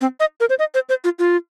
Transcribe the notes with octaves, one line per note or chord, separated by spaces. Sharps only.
C4
D#5
A#4
C5
D#5
C5
C5
F4
F4